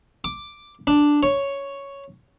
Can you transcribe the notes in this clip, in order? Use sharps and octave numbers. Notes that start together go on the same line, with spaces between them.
D6
D4
C#5